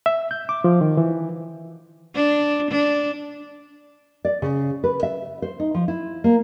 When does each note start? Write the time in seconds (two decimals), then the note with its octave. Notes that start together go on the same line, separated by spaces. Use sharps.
0.06 E5
0.31 G6
0.49 D6
0.64 F3
0.81 D#3
0.97 E3
2.15 D4
2.71 D4
4.25 D5
4.42 C#3
4.84 B4
5.03 E5
5.42 C5
5.60 D#4
5.74 F3
5.88 E4
6.24 A#3